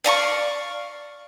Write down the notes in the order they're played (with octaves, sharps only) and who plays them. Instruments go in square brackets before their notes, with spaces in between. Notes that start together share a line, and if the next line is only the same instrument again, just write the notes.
[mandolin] D5 F5 A#5 C#6